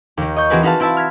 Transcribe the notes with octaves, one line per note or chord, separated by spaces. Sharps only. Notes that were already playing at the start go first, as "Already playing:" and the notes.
D#2 D#3
D#5 C#6 G6
E3 C4 F#4 G#4 A#4 B4
D#4 F#4 B4 F5 A5
C4 E4 E5 A5 B5
F6 G#6 B6